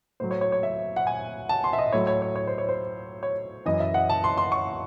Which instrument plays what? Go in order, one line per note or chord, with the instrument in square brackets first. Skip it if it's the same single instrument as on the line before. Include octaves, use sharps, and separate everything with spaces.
[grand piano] A2 F#3 C5
C#5
C#5
C#5
E5
F#5
G#5
A5
C6
E5
D#5
A2 F#3 C#5
C#5
C#5
C#5
C5
C#5
C5
C#5
F#2 E3 D#5
E5
F#5
A5
C6
C6
C#6